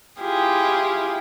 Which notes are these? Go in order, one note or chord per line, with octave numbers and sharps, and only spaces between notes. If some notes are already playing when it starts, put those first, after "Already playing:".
E4 F4 G4 G#4